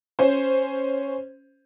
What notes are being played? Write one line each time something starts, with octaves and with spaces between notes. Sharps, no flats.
C#4 C5